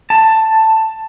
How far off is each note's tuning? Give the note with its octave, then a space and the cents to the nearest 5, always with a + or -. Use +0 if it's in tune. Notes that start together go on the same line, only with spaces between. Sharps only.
A5 +10